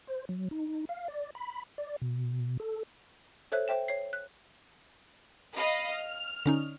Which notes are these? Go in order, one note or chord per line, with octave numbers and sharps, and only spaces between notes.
C5
F#3
D#4
F5
D5
B5
D5
B2
A4
A4 C5 C#5 E5 F#6
C5 E5 G5 E7
C#5 C7
F#6
D#5 F5 B5
F6
D3 C#4 D#4